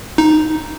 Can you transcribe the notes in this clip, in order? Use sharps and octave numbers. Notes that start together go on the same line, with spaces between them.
D#4